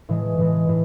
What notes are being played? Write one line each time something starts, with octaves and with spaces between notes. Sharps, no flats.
A2 E3 G#3
A2 E3 G#3
A2 E3